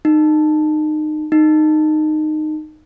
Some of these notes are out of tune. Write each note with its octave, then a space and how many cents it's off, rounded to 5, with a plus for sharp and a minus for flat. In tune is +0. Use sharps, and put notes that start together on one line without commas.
D#4 -25
D#4 -15